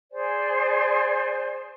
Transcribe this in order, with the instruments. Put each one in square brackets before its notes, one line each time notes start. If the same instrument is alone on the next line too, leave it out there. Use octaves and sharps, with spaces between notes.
[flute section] G#4 C5 D5 G#5